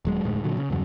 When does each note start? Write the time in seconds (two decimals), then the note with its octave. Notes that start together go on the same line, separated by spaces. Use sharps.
0.05 D#1 F#3 G#3
0.24 F1 D2 A2 G#3
0.44 A#2 D3 F#3
0.57 C#3
0.70 E2 G2 C#3 F#3